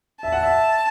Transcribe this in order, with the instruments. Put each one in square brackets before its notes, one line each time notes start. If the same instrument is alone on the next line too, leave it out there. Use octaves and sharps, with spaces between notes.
[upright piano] E5 [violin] A5
[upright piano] F#5
E5